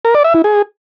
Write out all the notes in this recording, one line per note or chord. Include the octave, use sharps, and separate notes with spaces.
A#4
D5
E5
E4
G#4